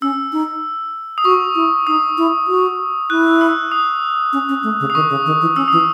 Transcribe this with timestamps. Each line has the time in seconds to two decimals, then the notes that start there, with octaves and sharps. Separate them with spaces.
0.02 C#4 E6
0.32 D#4
1.18 D#6
1.25 F#4 C#6
1.55 E4
1.87 D#4 D#6
2.18 E4
2.48 F#4
3.10 E4 F#6
3.41 E6
3.72 D#6
4.33 C#4
4.49 C#4
4.63 A3
4.80 C#3
4.90 D#6
4.95 D#3 C#6
5.10 C#3
5.26 D#3
5.41 E3
5.56 C#4 E6
5.68 E3 D#6